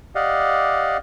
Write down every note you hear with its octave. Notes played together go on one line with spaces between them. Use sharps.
G4 D5 D#5 F5 F#5